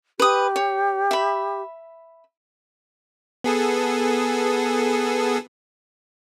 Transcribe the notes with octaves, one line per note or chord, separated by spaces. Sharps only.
G4 B4 D#6
C#5
E5 B5
B3 G#4 A4